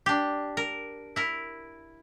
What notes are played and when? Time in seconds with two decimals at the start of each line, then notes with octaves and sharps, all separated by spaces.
0.06 D4 G4
0.57 A#4
1.16 E4 A#4